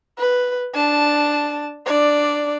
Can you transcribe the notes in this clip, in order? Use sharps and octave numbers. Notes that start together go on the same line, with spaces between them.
B4
D4 A5
D4 D5